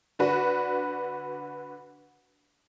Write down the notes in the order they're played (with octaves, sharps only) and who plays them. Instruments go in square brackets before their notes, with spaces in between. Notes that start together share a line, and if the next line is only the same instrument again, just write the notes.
[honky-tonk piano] D3 D4 F#4 B4